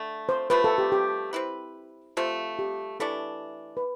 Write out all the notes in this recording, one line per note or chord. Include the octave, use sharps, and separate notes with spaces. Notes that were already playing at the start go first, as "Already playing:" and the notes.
Already playing: D3 A3
C5
C3 F3 A3 C4 B4
A4
G4
G4
C4 E4 B4
C3 F3 A3
G4
E3 A3 D4 A4
B4